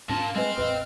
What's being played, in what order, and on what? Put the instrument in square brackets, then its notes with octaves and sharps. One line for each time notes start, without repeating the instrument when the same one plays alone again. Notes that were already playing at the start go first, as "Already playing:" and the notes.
[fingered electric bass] G#2 C#4 D4 [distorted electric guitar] A#3 F4 [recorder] A5
[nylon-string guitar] G#3 B4 [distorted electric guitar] C4 [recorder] F6
[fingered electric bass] A1 E2 [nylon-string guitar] B4 D#5 F5